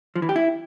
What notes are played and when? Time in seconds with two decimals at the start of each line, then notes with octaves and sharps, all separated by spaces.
0.16 F3
0.22 E3
0.29 G4
0.36 E4